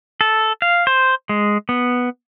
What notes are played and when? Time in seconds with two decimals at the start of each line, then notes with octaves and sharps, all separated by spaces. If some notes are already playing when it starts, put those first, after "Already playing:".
0.21 A4
0.62 F5
0.87 C5
1.29 G#3
1.69 B3